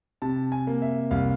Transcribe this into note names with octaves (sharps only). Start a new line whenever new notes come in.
C3 A5
G#5
A#3
E5
C2 F5